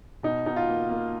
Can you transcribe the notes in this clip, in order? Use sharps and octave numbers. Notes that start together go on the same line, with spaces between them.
B2 D#4
B2 D#4
F4
A#3
A#3